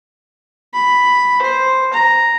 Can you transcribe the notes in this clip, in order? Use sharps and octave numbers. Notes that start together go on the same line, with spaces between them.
B5
C5
A#5